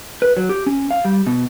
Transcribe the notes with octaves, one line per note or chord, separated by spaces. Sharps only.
B4
F#3
G4
C#4
F5
G3
B2